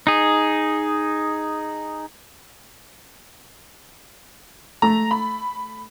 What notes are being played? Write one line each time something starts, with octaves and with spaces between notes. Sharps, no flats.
D#4 G#4
A3 A#5
B5